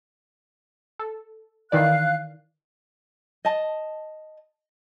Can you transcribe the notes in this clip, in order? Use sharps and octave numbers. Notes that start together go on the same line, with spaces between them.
A4
D#3 E3 D5 F5 F#6
D#5 A5